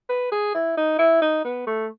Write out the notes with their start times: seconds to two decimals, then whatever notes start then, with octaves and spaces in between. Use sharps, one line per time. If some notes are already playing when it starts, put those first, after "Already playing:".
0.09 B4
0.32 G#4
0.55 E4
0.77 D#4
0.99 E4
1.22 D#4
1.44 B3
1.67 A3